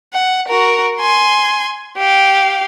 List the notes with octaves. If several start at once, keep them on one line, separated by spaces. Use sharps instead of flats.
F#5
F#4 A#4
G#5 C6
G4 F5